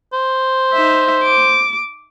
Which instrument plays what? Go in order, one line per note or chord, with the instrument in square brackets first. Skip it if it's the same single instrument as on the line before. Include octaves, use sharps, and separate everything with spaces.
[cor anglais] C5
[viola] D#4 E5
D6